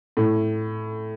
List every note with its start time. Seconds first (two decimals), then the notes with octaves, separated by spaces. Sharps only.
0.17 A2